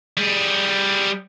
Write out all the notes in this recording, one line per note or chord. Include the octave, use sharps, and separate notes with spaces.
G3 G#4